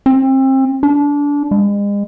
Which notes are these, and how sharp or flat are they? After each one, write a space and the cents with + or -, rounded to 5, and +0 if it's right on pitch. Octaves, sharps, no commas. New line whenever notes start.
C4 +30
D4 -25
G#3 -40